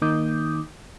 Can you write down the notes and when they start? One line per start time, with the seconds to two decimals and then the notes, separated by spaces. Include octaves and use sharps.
0.02 D#3 A#3 D#4 D6 D#6 G6